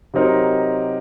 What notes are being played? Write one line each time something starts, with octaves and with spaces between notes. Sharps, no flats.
C3 F#3 C4 D#4 A#4